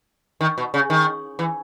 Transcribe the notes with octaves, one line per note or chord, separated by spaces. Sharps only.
D#3
B2
C#3
D#3
E3